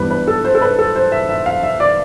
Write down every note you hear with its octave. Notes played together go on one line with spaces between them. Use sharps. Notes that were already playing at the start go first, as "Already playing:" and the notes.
Already playing: G2 E3 G3 B3 B4
B4
A4
C5
A4
B4
A4
C5
E5
E5
F5
E5
D5